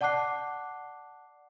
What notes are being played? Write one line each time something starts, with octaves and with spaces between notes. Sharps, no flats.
D5 F#5 A5 D6 F#6 C7